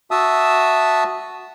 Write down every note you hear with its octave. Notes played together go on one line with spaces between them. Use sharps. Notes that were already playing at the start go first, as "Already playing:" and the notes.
F#4 E5 A5 D#6 E6